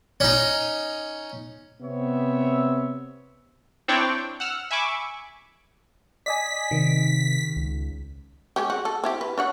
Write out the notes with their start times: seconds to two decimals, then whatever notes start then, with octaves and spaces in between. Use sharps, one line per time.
0.20 C#4 D#4
1.82 C3 B3 C4 C#5 E5
3.88 C4 D4 E4 C#5 D5 G5
4.40 F#5 E6 F6
4.71 E5 G#5 B5 C#6 D6
6.26 D5 D#5 G#5 B6
6.71 C3 D#3
7.56 C#2
8.56 G#3 C#4 G4
8.70 F#4
8.85 A4
9.04 C4 E4 G4
9.21 B4
9.38 D4 C#5 F#5